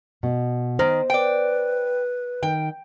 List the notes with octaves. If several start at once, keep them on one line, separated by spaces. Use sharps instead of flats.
B2
D#3 C5
B4 D5 G5
D#3 G5